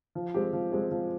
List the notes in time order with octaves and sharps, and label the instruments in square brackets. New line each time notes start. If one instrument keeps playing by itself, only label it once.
[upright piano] F3
G#3 C4 G4
F3
G#3 C4 G4
F3